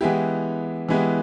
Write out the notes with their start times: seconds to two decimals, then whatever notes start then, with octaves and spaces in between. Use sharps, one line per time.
0.01 E3 G#3 B3 E4 G4
0.89 E3 G#3 B3 E4 G4